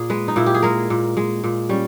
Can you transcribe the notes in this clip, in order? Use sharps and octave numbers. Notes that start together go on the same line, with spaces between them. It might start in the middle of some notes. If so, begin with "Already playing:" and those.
Already playing: A#2 G#4
G#3 B4
D#4
A#2 E4
G4
G#4
G#3 A#4
A#2
G#3
A#2
G3 C#4